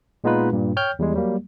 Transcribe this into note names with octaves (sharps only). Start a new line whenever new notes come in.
A#2 G#3 B3 D#4 F4 B4
G2 A#2
C#5 G5 F6 G6
E2 G3 G#3
F#3 G3 A#3